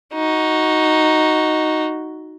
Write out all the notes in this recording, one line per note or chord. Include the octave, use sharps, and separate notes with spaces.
D#4 F#4